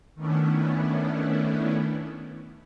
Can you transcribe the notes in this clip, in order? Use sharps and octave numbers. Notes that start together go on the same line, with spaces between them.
D#3 A3 B3 C#4 D4 E4